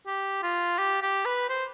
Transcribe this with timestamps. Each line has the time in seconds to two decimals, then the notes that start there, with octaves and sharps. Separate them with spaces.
0.07 G4
0.43 F4
0.78 G4
1.02 G4
1.25 B4
1.49 C5